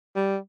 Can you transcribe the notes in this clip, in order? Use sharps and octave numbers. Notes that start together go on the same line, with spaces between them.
G3